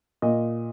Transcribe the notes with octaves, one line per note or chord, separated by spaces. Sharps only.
A#2 D#5